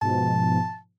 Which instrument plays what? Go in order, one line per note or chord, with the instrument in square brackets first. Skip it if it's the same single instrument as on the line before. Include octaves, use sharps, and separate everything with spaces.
[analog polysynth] G#2 B2 F3 [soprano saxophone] A5